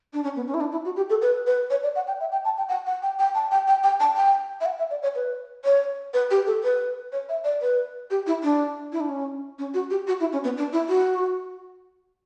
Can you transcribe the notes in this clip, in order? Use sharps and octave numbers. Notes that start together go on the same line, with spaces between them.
D4
C#4
B3
C#4
E4
D4
E4
F#4
G4
A4
B4
B4
C#5
D5
F#5
G5
E5
G5
A5
G5
F#5
F#5
G5
G5
A5
G5
G5
G5
A5
G5
E5
F#5
E5
D5
C#5
B4
C#5
B4
G4
A4
B4
C#5
E5
D5
B4
G4
E4
D4
E4
D4
C#4
C#4
F#4
G4
F#4
E4
C#4
B3
D4
E4
F#4